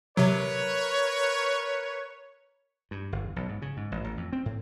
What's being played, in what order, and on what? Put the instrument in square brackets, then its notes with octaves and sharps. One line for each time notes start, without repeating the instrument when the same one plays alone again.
[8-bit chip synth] C3 F#3 [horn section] A#4 B4 C#5
[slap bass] G2
G1
E2
B1
G#2
C#3
G#2
A1
A1
F2
C4
A2